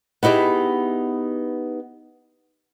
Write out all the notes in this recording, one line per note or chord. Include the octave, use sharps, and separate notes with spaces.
B3 D#4 E4 G4 G#4